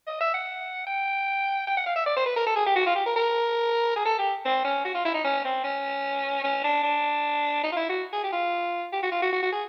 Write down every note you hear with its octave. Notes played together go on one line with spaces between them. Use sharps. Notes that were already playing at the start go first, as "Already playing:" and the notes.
D#5
E5
F#5
G5
G5
F#5
F5
E5
D5
C5
B4
A#4
A4
G#4
G4
F#4
F4
G4
A#4
A#4
G#4
A4
G4
C4
C#4
F#4
F4
E4
D#4
C#4
C4
C#4
C#4
D4
D4
D#4
F4
E4
F#4
G#4
G4
F4
G4
F#4
F4
F#4
F#4
F#4
G#4